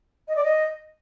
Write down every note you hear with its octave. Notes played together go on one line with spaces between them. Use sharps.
D#5
D5
D#5